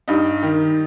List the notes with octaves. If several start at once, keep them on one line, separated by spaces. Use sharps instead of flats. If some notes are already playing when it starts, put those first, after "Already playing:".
G2 D#4
D#3